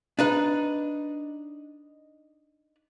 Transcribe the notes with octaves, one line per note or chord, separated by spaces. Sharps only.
D4 D#4 B4